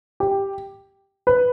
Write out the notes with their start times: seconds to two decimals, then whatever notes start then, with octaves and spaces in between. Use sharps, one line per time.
0.20 G4
1.27 B4